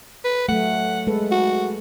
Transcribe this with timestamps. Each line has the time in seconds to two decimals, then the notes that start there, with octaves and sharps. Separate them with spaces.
0.24 B4
0.48 F#3 A3 F#5
1.07 G#3 A4 B4
1.31 F#4